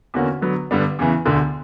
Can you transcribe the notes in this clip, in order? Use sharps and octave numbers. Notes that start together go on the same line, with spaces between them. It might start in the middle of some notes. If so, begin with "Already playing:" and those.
E2 D3 A#3 C#4 F#4
D3 F#3 B3
G2 D3 G3 B3 D4
E2 C#3 E3
E1 D2 D3